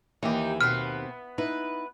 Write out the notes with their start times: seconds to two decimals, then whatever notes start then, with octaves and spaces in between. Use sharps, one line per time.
0.23 D#2 E3 D#4 G4
0.61 B2 B3 C4 F6
1.38 D#4 E4 B4